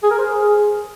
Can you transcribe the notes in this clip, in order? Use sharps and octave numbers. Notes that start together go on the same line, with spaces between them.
G#4
A#4
C5
G#4